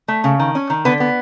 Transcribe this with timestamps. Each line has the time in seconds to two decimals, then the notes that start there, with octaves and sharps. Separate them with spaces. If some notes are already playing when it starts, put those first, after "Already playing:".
0.08 A3
0.24 C#3
0.39 D#3
0.55 C#4
0.70 D#3
0.85 D3 B3 B4
1.00 B3